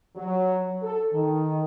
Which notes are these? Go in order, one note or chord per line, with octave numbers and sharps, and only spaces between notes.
F#3
A4
D#3